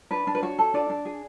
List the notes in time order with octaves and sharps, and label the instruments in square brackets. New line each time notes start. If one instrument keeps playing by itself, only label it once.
[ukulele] D4 B4
D4
B4
F#4 C#5
A4
D4 D5
D4
G#4